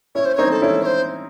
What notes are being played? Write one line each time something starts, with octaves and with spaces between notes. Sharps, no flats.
C#4 E4 C#5
C5
C4 D#4 C#5
A4
C#4 E4
C#5
C5